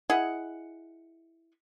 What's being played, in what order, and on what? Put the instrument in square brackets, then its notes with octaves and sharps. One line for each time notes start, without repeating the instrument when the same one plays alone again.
[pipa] E4 G#4 D#5 F#5